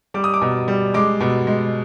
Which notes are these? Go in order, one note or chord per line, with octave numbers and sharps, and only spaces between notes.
G3 D6
D#6
D6
B2
G3
G#3 D6
B2
G#3